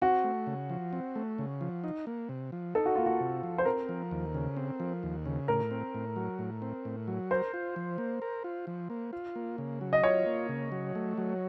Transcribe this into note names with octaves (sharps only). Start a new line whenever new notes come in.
C4 F#4
A3
C#3
F3
C4
A3
C#3
F3
D#4
A#3
C3
F3
D#4 A4
F#4
A#3 F4
F#4
C3
F3
C5
C4 A#4
F3
D#2
C#3
C4
F3
D#2
C#3
A2 A#4
C4
A2
F#3
A2
C4
A2
F#3
A#4 C5
F4
F3
A#3
A#4
F4
F3
A#3
F4
A#3
C#3
F#3
D#5
F4 C#5
A#3
C#3
F#3
A3
F#3